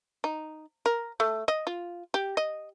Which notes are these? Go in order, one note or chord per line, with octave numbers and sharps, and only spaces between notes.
D#4
A#4
A3
D#5
F4
G4
D#5